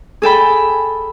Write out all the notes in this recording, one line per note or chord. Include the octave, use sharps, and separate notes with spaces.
G#4 A4 G5 B5